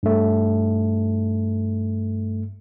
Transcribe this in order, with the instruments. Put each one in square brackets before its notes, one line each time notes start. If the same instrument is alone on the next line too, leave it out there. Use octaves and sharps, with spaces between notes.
[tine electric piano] G2 A3